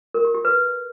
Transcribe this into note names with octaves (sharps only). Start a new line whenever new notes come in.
A#4
G4
G4
B4